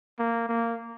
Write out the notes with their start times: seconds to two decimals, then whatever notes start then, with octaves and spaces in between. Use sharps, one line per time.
0.19 A#3
0.49 A#3